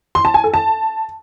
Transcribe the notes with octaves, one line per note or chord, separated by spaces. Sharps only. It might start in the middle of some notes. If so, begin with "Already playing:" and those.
C6
A5
G#5
A4
A5